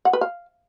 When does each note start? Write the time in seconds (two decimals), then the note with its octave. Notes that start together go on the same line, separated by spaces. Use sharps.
0.05 F#5
0.13 B4
0.21 F5